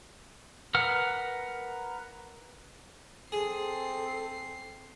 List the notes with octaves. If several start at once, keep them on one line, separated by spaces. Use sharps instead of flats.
A#4 B4 F#5 F6
C4 G#4 A4 C7